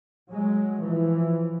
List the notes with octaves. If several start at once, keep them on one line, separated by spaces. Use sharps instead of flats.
F#3 G#3
E3 F3